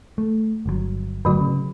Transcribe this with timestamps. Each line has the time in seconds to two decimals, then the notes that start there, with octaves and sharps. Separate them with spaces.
0.18 A3
0.66 G1 A#2 F#3
1.25 G1 A2 D3 F#3 F#4
1.40 C#3